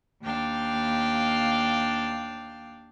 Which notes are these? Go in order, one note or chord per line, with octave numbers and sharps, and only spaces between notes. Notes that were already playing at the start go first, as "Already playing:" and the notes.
D#2 D4 F5 G5